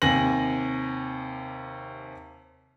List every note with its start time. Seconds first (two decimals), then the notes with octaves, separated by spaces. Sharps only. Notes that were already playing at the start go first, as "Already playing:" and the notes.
0.02 D#2 C3 G#5 A#6 F#7